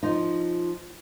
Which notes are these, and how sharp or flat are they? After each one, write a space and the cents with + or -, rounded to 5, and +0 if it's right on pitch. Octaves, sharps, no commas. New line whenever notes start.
F3 +0 D#4 +0